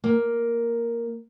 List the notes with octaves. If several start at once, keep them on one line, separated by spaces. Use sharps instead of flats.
A#3